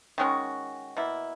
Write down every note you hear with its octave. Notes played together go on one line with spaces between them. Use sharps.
D#3 G#3 C#4 F#4
B2 A#3 E4